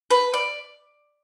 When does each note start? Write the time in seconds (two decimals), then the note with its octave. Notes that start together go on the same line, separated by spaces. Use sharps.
0.11 B4
0.34 D5